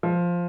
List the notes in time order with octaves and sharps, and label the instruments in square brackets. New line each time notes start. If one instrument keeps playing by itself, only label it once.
[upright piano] F3